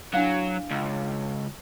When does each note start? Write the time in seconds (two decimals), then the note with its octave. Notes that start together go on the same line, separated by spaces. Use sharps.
0.14 F#3 D4 E4 F5
0.71 C#2